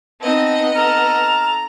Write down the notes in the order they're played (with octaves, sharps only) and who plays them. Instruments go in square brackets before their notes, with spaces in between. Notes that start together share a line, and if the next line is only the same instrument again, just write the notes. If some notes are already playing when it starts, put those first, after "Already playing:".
[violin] B3 D#5 [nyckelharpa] C4 D#4 [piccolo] A5
[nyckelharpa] A4 [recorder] A#5 [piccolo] F6